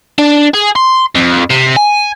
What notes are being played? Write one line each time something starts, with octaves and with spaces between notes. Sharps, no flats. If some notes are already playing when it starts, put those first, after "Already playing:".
D4
G#4
C6
F2
C3
G#5